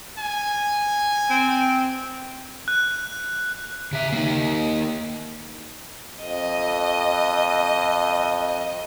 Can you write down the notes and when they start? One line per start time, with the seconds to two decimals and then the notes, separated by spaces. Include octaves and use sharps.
0.19 G#5
1.30 C4
2.68 F#6
3.92 C#3 E5
4.12 A#3 D#4
6.23 F2 D#5